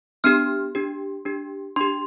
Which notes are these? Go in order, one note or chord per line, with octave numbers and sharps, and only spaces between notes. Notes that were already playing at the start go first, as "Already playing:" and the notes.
B3 D4 G4 F6
D4 G4
D4 G4
D4 G4 C6